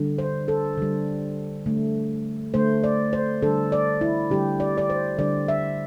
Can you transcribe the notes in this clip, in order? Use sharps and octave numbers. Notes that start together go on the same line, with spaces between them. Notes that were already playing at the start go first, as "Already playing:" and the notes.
Already playing: D3 G3
C5
A4
D3 G3
D3 A3
D3 A3 C5
D5
C5
D3 G3 A4
D5
E4
D3 G3 G4
D5
D5
C5
D3 G3 D5
E5